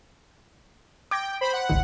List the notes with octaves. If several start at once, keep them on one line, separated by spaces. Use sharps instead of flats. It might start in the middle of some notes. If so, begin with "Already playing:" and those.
G5 D6 G#6 A#6
C5 B5
F#5
G#1 C#2 D#3